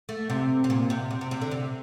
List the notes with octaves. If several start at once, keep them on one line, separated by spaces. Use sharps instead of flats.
A3
C3
C3
A#2
C3
C3
C3
C3
D3
C3